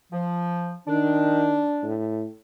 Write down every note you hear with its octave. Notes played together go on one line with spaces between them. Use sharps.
F3
D#3 D4
A2